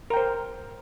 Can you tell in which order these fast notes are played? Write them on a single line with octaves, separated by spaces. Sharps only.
A#4 G5 C5